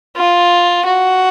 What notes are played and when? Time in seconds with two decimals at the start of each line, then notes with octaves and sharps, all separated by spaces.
0.16 F4
0.85 F#4